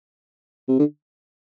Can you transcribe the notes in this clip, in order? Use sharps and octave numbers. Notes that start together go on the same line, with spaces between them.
C3
D3